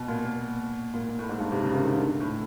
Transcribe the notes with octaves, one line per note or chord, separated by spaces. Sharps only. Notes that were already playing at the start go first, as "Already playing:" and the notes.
Already playing: B2
A#2
A#2
A#2
A#2
A2
G#2
G2
C3
C#3
D#3
D3
D3
D3
A2